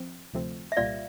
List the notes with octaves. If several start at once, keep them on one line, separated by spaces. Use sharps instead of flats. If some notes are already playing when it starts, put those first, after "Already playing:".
Already playing: F3 C4
D2 C3 F3 A3 C4
E5
C2 A#2 G3 A#3 F4 D5 F5